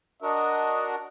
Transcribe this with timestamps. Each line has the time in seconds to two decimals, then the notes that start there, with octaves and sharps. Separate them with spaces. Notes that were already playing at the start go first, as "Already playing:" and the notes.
0.23 D4 F#4 A#4 D#5